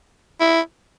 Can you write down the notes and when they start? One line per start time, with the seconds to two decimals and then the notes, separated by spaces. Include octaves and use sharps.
0.40 E4